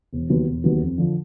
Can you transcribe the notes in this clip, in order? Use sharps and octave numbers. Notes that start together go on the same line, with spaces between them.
E1
D#2 D#3 F#3 B3
E1
D#2 D#3 F#3 B3
F2
D3 F3